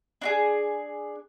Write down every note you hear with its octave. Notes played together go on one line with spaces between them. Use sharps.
D4 F#4 G#4